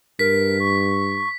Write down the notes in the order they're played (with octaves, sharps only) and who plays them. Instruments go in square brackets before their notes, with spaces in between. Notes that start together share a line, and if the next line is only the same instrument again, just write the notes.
[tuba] G2 [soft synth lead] A#4 [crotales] B6
[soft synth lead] C#6